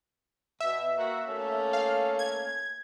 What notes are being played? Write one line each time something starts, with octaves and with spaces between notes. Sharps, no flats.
B2 E5
A#3 F#4
A3 A#3 C#4
F5
G#6